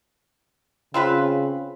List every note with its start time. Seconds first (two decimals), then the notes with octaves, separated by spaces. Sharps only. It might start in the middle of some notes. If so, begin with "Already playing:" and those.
0.94 C#3 C4 F4 B4